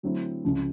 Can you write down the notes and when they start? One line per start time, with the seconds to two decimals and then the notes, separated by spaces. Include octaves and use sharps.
0.03 D3 F#3 A3 C4 E4
0.45 C#2 C#3 F3